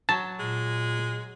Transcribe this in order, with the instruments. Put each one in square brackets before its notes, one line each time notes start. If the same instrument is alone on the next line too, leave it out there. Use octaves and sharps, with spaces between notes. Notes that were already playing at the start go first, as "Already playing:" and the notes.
[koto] F#3 [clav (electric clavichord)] A5
[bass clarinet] A#2 [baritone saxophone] G#3